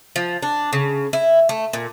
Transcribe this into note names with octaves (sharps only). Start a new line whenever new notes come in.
F3
D4
C#3
E4
A3
A#2